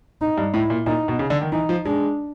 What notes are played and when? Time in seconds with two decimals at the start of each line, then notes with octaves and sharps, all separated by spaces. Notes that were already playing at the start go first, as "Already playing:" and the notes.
0.21 D#4
0.38 G2
0.54 A2 E4
0.70 A#2
0.86 A#2 D#4
1.08 B2
1.19 C#3
1.30 D3
1.42 D#3
1.52 E3 D#4
1.69 F3
1.86 G#3 D4